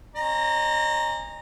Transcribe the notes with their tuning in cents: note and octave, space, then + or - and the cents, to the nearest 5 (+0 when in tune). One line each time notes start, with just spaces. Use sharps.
C#4 -35 D#5 -35 A#5 +0